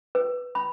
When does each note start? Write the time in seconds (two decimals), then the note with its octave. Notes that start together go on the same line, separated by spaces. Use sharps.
0.15 B4
0.55 B5